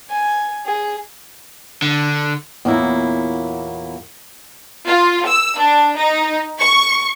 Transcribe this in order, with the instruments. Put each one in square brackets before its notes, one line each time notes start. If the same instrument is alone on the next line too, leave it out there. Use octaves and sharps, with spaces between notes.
[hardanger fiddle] G#5
G#4
[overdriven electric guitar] D3
[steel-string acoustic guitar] E2 A#2 F#3 A#3 E4
[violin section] F4
E6
D4
D#4
C#6